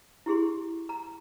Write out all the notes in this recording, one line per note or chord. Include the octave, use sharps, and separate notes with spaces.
E4 G4 G#4 C6
A#5